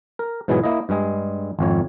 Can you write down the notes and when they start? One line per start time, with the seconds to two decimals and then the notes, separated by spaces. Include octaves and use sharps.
0.19 A#4
0.48 G#2 B2 E3 F#3 E4 G#4
0.64 A#3 E4 D#5
0.89 G2 G3 G#3 G#4
1.59 G#1 F2 C#5